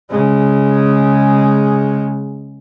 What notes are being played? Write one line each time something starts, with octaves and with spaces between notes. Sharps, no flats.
C#3 G#3